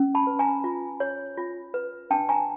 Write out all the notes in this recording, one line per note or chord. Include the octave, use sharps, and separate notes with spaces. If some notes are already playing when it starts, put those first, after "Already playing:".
Already playing: C#4
A5 B5
B4
G#5 A#5
F4
C#5
F4
B4
D4 G5 A5
G#5 A#5